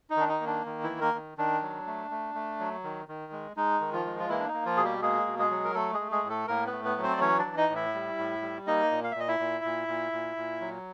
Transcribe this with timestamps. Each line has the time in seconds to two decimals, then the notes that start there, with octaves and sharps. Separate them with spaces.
0.10 D#4
0.17 D#3 D4
0.28 D#4
0.41 A#3
0.47 D4
0.65 D#3
0.83 E3 E4
0.89 A#3
1.01 A#3 A#4
1.14 D#3
1.38 D#3 D4
1.62 F#3
1.87 A3
2.11 A3
2.35 A3
2.60 F#3
2.84 D#3
3.08 D#3
3.32 G#3
3.56 G#3 D#4
3.81 D#3
3.93 F3 F4
4.05 G#3
4.19 F4
4.29 E3 A#3 E4
4.39 D4
4.48 D#4
4.54 A#3
4.66 F3 F4
4.77 B2 G#4
4.84 G3 G4
5.02 G#3 A#3 G#4
5.27 B2
5.39 G#3 G#4
5.51 F#3
5.64 A#4
5.75 A3 A4
5.93 G#3 G#4
6.00 A3
6.11 G#3 G#4
6.24 A2
6.30 A3 A4
6.48 A2 A#3 A#4
6.67 B3 B4
6.72 A3
6.85 B3 B4
6.97 F#3
7.03 C4 C5
7.13 D5
7.20 E3 C#4 C#5
7.39 D4 D5
7.45 E3
7.57 D#4 D#5
7.69 A2
7.75 E4 E5
7.95 G3
8.18 A2
8.42 G3
8.67 A#3 D#4 D#5
8.91 A#2
9.04 F5
9.11 E5
9.15 A#2 D#5
9.28 E4 E5
9.39 A#2
9.65 A#2
9.88 A#2
10.12 A#2
10.37 A#2
10.61 F#3